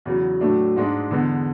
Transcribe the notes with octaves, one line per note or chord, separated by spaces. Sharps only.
E2 C#3 F#3
A2 F#3 A3 D4
G#2 G#3 D4
E2 D3 G#3 B3